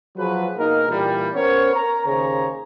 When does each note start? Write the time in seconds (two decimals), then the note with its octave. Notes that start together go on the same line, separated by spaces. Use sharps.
0.17 F3 F#3 F#4 G#4 B4
0.57 B2 A#3 D#4 G#4 A#4
0.89 A#2 E3 G3
1.34 B3 C#4 A#4 C5 C#5
1.75 A#4 A#5
2.05 D#2 C#3 G#4 C5 C#5 A#5